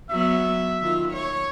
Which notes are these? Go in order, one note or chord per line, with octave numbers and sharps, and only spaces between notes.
F#3 B3 E5
D#3 F4
C#5